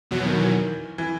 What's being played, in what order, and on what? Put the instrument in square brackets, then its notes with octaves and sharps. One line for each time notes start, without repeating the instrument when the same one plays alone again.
[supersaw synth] E2 B2 F#3
[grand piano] D#3
E3
E3